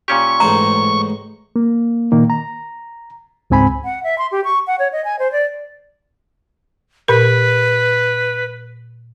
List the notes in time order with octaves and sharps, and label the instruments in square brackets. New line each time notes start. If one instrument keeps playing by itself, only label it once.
[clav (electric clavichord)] A#2 C#4 G4 [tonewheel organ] C#6
[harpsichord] A1 G#2 D#4 [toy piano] A#5
[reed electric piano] A#3
A#2 D#3 A#3
A#5
C#2 G#2 C4 G#5 B5
[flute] F#5
E5
C6
G4
C#6
F#5
C#5
D#5
G#5
C5
D5
[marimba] A#2 A#4 [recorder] B4